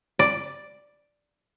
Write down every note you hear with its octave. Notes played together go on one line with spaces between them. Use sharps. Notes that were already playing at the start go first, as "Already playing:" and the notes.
D5